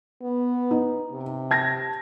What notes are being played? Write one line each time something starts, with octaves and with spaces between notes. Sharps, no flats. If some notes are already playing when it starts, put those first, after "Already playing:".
B3
D#4
C3
A5 G#6 A#6